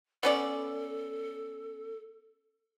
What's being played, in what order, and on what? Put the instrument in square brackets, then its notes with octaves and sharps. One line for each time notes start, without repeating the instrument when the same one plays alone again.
[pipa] B3 C#4 D5 [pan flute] A4